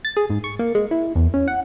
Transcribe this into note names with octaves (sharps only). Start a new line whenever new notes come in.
A6
G#4
G#2
C#6
A#3
G#3
E4
E2
C#4
F#5